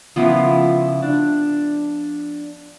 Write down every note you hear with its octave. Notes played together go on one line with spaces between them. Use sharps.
C#3 F3 B3 E4
D4